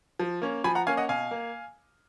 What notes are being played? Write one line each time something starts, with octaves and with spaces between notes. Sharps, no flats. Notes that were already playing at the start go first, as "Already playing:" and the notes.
F3
A#3 C#4
F3 G#5 B5
F#5 A#5
A#3 C#4 F5 G#5
D#5 F#5
B2 F5 G#5
A#3